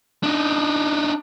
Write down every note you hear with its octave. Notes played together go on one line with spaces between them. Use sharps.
D4 D#4